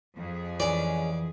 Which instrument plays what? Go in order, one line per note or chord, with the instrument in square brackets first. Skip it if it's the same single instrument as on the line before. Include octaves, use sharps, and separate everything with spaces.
[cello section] F2 G#4
[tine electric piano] E3 [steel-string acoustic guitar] G#3 C#4 [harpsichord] D5